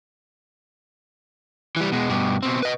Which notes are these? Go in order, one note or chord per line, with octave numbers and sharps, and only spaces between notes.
E3 G3
B2 G#3
G2 B2
B2 C4
B4 D#5